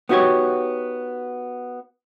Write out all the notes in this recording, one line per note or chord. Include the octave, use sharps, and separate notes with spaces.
B3 D#4 F#4 G4 C#5